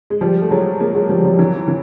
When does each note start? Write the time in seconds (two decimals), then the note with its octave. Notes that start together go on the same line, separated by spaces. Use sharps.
0.10 G#3
0.21 F3 G3
0.42 A3
0.50 F#3 G#3
0.80 G#3 A#3
0.95 F#3 G#3
1.09 F3 G3
1.20 F#3
1.24 F3 G3
1.39 E3 F#3
1.68 E3